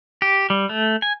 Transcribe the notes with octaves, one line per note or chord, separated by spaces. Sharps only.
G4
G3
A3
G#5